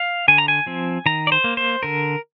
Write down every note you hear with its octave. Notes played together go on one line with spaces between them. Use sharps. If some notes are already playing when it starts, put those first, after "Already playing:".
Already playing: F5
D3 G#5
A#5
G#5
F3 C4
D#3 A#5
D5
C5
A#3
C5
D3 A#4